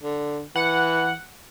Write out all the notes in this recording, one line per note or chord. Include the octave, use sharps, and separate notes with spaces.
D3
E3 F#5